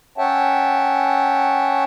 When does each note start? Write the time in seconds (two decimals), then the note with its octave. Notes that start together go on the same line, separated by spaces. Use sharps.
0.18 C#4 C#5 E5 F#5 G5 A5